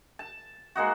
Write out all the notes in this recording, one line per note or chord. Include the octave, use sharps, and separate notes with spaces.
A5
G#3 A#3 D#4 F#4